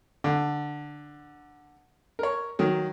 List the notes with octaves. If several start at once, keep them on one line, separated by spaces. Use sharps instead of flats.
D3
A#4 C#5
D#3 F#3